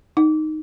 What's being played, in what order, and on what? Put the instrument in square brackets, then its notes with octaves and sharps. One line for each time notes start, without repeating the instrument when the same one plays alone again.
[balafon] D#4